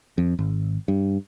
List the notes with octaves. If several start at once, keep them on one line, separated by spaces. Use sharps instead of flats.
F2
G#1
G2